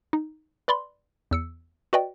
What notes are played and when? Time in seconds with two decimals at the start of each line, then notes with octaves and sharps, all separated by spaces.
0.13 D#4
0.68 B4 D5 B5 C6
1.31 E2 E6 C#7
1.93 F#4 B4 D5 D#5 G5